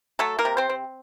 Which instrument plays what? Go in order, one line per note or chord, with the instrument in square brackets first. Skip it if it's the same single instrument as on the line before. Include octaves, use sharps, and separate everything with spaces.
[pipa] F#3 A3 A4
A#3 A#4
C3
C4 C5
C4